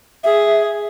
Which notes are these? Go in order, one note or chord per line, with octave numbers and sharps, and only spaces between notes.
G#4 E5